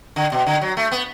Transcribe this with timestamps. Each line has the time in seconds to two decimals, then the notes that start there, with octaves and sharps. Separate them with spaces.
0.16 D3
0.32 B2
0.46 D3
0.61 F#3
0.77 A3
0.91 B3